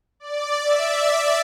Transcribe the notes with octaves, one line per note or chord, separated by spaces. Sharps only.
D5
E5